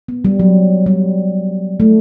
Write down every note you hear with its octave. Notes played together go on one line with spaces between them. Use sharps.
B3
G3
F#3
G3
A3